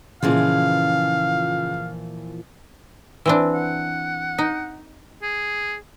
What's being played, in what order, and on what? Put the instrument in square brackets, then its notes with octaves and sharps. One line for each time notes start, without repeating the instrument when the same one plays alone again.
[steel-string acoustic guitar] A#2 E3 F3 [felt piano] C#3 [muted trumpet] F5
[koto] E3 C4 D4
[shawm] F#5
[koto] D#4
[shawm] G#4